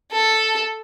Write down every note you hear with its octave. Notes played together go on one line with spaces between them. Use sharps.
A4